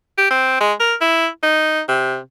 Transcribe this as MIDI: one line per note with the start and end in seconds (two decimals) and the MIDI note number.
0.18 0.29 67
0.31 0.59 60
0.60 0.73 56
0.80 0.95 70
1.01 1.27 64
1.43 1.81 63
1.89 2.19 48